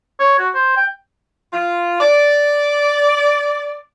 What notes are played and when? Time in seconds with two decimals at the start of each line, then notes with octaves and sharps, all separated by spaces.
0.20 C#5
0.39 F#4
0.54 C5
0.77 G5
1.52 F4
2.00 D5